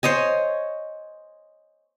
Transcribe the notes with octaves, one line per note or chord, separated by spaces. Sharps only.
C5 C#5 D#5 G#5